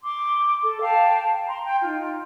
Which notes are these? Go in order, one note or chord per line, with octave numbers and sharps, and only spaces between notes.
C6 D6
A4
F5 G5 A5
A#5 C6
G5
D#4 F4